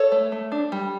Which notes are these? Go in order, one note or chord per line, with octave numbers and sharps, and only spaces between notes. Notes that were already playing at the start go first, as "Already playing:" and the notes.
Already playing: A4 C#5
A3
A3
D4
G3